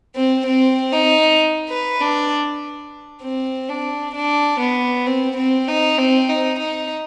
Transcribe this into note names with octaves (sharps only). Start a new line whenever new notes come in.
C4
C4
D#4
B4
D4
C4
D4
D4
B3
C4
C4
D#4
C4
D#4
D#4